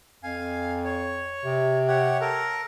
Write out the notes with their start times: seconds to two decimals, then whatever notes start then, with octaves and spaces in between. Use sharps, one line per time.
0.23 F2 F5 G#5
0.84 C#5
1.44 C3
1.88 G4 C#5 F#5
2.21 A4 A#4